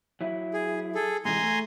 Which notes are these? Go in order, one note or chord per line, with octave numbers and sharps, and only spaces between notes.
F#3 E4
G#4
G#4 A4
G#2 C3 E3 G#5 A#5 C6
A3